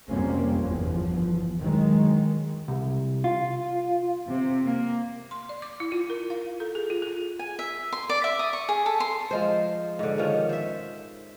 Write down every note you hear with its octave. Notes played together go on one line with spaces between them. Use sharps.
F2 C3 G3 A#3 C4 C#4
G1 E2 F3
G2 D#3 F#3 G#3
C2
F4
C3
A#3
C6
D5
D6
E4
F4
A#4
F5
A4
G#4
F4
G#4
G#5
E5
C6
D5
E5
D#6
C#6
G#4
A4
C6
F3 G#3 C5
G#2 D3
D#3 F3 C#4
C5 E5